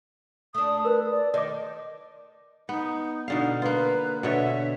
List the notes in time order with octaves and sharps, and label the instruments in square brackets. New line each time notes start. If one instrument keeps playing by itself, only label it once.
[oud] A3 D4 [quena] D#6
[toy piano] A#4 [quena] B4
[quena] D5
[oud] D#3 [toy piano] D5 D6 [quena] D#5
[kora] B3 [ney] D#4
[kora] B2 D3 F5 [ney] D#4
[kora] A#3 F4 [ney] B4
[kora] B2 D3 C#5 [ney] E5